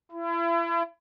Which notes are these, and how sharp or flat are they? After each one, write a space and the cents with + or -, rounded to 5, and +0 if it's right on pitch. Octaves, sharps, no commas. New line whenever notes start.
E4 +35